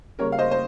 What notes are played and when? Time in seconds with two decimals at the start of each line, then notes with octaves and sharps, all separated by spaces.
0.19 C#3 G3 A#3 A#4 C#5
0.32 F5
0.39 C5 D#5
0.51 C5